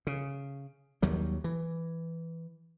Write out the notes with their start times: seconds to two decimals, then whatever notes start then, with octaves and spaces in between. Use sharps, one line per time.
0.07 C#3
1.02 D#2 F#3 G3
1.44 E3